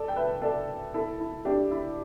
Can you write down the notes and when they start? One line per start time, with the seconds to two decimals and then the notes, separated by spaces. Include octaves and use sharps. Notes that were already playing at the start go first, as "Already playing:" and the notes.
Already playing: A4 D5
0.08 G5
0.16 B4 E5
0.42 A4 D5
0.94 E4 A4
1.20 E4
1.45 D4 G4
1.71 E4